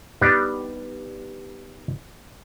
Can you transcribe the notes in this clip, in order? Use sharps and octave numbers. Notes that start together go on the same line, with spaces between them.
G3 B3 D4 D#4 G4 D5